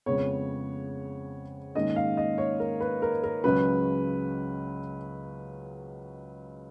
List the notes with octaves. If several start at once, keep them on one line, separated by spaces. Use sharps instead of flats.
F2 C#3 G#3 B3 C#5
G#2 D#3 A#3 C#4 D#5
F5
D#5
C#5
A#4
B4
A#4
A#4
C#2 C#3 F#3 C#4 B4